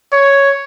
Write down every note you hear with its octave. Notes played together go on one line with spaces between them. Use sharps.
C#5